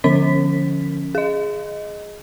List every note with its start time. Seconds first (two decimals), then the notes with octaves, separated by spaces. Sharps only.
0.04 D3 F3 C#4 B6
1.15 G#4 D#5